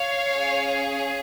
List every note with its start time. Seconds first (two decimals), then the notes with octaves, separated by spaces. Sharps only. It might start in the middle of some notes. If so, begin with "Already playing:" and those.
Already playing: C#5 F5
0.33 C#4 G#4